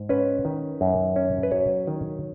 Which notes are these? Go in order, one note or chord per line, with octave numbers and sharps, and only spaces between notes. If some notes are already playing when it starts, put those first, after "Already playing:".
Already playing: G#2
C#4 B4
D#3
F#2
C#4
B4
F#3 C#5
D#3